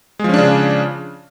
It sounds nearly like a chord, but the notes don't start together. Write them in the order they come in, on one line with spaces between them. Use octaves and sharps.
G#3 F3 C#4 D4 C#3